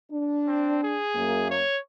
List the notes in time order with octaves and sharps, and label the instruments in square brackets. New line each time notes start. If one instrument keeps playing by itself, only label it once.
[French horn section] D4
[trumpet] C4
G#4
[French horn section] F#2 A#3
[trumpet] C#5